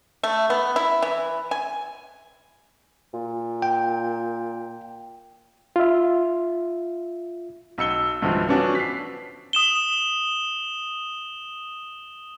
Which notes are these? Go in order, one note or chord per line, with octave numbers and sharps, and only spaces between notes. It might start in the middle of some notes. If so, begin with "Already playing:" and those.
A3
B3
E4
E3
G#5
A#2
G5
F4 E5
B1 E6 C#7 G7
B1 G2 D3 E3 F3
F3 B3 C#4 D4 F#4
B6 C7
D#6 E7 G7